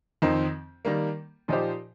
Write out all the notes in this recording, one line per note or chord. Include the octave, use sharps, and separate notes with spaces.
F2 D#3 C4 D#4
D#3 G3 A#3
A#2 F3 D#4 G4 C5